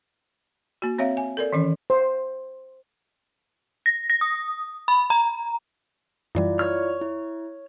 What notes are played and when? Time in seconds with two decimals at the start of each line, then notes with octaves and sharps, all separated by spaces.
0.82 A#3 F#4
0.99 C4 C#5 E5 F5
1.17 G#5
1.37 A4 A#4 D5
1.52 D#3 E3 C#4
1.90 C5
3.86 A#6
4.10 A#6
4.21 D#6
4.88 B5
5.10 A#5
6.35 F#2 E3 G3 E4 F4 D5
6.59 C#5 F6
7.01 E4